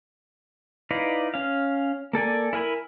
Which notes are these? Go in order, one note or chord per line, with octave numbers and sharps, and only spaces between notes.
D#4 E4 B4 D5 F5
C#4 F5
A#3 A4 D5 G#5
E4 A#4 G#5 B5